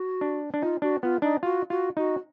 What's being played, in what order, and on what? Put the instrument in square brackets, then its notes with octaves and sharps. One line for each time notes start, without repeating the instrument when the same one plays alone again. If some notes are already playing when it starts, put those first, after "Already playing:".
Already playing: [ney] F#4
[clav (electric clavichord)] D4
D4
[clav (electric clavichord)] D#4 [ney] F4
[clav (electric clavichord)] D4 [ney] F#4
[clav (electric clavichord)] B3 [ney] F4
[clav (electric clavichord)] D4 [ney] D#4
[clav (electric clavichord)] F4 [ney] F#4
[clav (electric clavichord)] F4 [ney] F#4
[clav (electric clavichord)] D#4 [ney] F#4